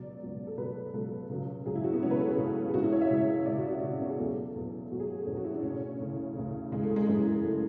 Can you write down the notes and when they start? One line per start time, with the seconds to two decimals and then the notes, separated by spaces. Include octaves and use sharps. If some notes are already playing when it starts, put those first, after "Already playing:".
Already playing: C#2 B2 F#3 D5
0.22 C#2 B2 F#3
0.47 A4
0.57 C#2 B2 F#3 B4
0.93 C#2 B2 F#3 A4
1.29 C#2 C#3 F#3
1.66 C#2 C#3 F#3 G#4
1.75 E4
1.84 F#4
1.93 B3
2.02 C#2 C#3 F#3 C#4
2.11 B4
2.20 A4
2.29 G#4
2.38 C#2 C#3 F#3
2.69 G#4
2.74 C#2 C#3 E3 F#4
2.84 E4
2.92 C#5
3.01 E5
3.10 C#2 C#3 E3
3.46 C#2 C#3 E3 D5
3.58 F#4
3.70 F#4
3.82 C#2 C#3 E3 E4
3.92 C#4
4.01 B3
4.09 G#4
4.18 E2 B2 F#3 A4
4.55 E2 B2 F#3
4.91 E2 B2 F#3 F#4
5.00 G#4
5.18 A3
5.26 E2 B2 F#3 C#4
5.36 F#4
5.45 E4
5.54 D4
5.63 D2 C#3 E3 C#4
6.00 D2 C#3 E3
6.36 D2 C#3 E3
6.72 D2 C#3 E3 G#3
6.83 A3
6.96 G#3
7.07 F#2 C#3 E3 G#3
7.43 C#3 E3 A3